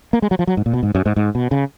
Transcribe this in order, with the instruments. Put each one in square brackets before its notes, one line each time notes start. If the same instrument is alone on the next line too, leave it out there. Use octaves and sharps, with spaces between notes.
[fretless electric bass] A#3
G#3
F#3
F3
F#3
G#2
A#2
B2
G#2
F#2
G#2
G#2
B2
C#3